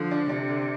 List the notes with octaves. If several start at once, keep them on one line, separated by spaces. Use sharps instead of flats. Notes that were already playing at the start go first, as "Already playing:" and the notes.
Already playing: D3 F3
D4
C3 D4
D3